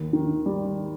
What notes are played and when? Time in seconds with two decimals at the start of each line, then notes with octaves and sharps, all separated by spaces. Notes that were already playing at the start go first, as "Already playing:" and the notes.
Already playing: D#2
0.13 D#3
0.46 G3